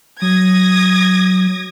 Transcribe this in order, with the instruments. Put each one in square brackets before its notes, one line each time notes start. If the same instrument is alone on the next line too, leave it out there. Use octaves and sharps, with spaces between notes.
[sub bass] F#3 [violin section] D#6 G#6 A#6